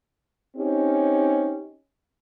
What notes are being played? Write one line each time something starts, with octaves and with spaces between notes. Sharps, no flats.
C4 C#4 D#4 G4